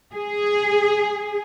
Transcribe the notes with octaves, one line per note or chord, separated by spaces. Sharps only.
G#4